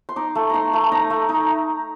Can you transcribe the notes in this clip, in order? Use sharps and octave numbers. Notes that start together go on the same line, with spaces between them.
C6
D#4 D6
A3
D#4 A#5 C6
A3
D#4 A#5
A3
D#4